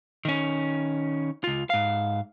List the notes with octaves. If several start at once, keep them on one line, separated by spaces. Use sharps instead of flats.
D#3 C#4
C#2 F4
G#2 F5